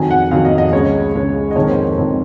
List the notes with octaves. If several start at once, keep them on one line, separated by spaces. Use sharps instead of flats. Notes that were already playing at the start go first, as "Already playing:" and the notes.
Already playing: F2 D#3 F#3 G#5
F#5
F2 D#3 F#3 F5
D#5
D#5
C#2 C#3 G#3 C#4 C#5
C#2 C#3 G#3 C#4
D#5
F2 D#3 G#3 C#5
A#4
C5
C#5
F2 D#3 G#3